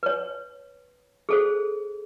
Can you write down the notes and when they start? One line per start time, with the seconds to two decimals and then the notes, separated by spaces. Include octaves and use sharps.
0.03 B4 C#5
1.29 G#4 A4 C5